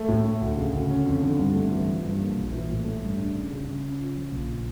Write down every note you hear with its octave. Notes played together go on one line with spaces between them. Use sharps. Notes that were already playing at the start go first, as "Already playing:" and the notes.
Already playing: A3
A2
A3
D2
C#3
D2
C#4
F2
D3
G2
A3
E3
F3
G2
A#3
A#1
E3
A2
A3
G2
D4
C#3
C#3
C#3
C#4
F4
F3
A#1